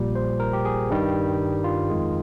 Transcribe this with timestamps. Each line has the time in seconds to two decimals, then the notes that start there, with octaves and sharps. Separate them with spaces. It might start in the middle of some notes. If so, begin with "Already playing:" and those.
Already playing: A#1 A#2 G3
0.15 C5
0.40 A#4
0.53 G4
0.65 G#4
0.90 G2 D#3 G3
1.64 F4
1.90 F2 D#3 G#3